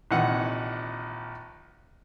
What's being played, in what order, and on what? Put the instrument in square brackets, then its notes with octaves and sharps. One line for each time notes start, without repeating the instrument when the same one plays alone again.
[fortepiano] A#1 C3 D#3 E3 F#5